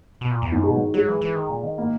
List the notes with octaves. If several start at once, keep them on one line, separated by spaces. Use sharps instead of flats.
B2
A#2
E2
F#2 D#3
B2 G#3
F#3
F#3 G#3
E3
E3
D#3
A#2
D#3
A#3